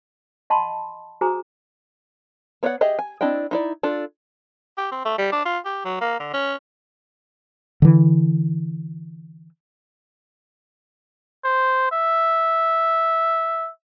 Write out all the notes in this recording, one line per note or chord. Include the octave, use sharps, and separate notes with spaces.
D#5 F#5 A5 B5 C6
F#4 G#4 C5 G#5 A#5 D#6
B3 C#5 D5 E5 F#5
G4 G#4 D#5 E5
G#5
C4 D4 E4 D#5 G5
D#4 E4 D5
D4 F4 A4
G4
C4
A3
G3
D4
F4
G4
F#3
A#3
D3
C#4
D3 E3
C5
E5